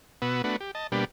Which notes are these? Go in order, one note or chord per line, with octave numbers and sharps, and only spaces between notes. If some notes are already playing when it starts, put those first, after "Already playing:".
B2 B3 F#4 B4 E6
A3 B3 D4 F#4 B4
G4
D#5 A5
B2 G3 A#3 D4 G4 B4